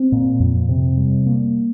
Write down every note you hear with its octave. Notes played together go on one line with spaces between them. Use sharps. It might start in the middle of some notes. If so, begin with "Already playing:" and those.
Already playing: C4
A#2
F2
C3
G3
A#3